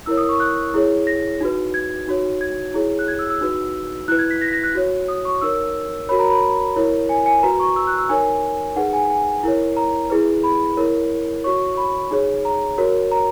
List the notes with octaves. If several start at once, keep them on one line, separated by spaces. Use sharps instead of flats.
E4 A#4 C#5 E6
D#6
C#6
F#6
E4 G#4 C#5
A#6
D#4 F#4 B4
G#6
D#4 F#4 C#5
G#6
E4 G#4 C#5
F#6
G#6
E6
E6
D#4 F#4 B4
E4 B4 F#6
G#6
B6
A#6
B6
A#6
F#6
F#4 C#5
D#6
C#6
D#4 A#4 C#5 E6
F#4 A#4 C#5 B5
A#5
B5
E4 A#4 C#5
G#5
G#5
F#4 B4 A#5
C#6
E6
F#6
E6
D#4 A#4 C#5 G#5
D#4 G#4 B4 F#5
G#5
G#5
E4 A#4 C#5
A#5
E4 G#4 B4
B5
E4 A#4 C#5
F#4 C#5 C#6
B5
D#4 G#4 C#5
A#5
F#4 A#4 C#5
A#5